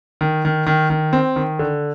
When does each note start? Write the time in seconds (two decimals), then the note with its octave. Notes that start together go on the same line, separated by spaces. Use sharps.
0.21 D#3
0.45 D#3
0.66 D#3
0.90 D#3
1.13 C4
1.36 D#3
1.59 D3